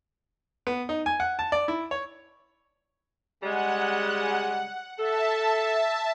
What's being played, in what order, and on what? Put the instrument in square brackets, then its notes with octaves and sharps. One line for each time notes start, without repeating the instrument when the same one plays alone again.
[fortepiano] B3
D#4
G#5
F#5
A5
D5
E4
C#5
[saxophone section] C#3 G3 G#3 [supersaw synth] F#5
[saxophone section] A4 [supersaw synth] E5 A5